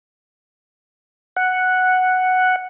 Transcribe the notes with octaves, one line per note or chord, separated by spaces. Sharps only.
F#5